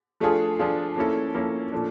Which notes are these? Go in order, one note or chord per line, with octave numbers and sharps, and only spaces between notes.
F3 A3 D4 F4 G#4
F3 A3 D4 F4 G#4
F3 A#3 C#4 E4 A4
F3 A#3 C#4 E4 A4
A#2 F3 A3 D4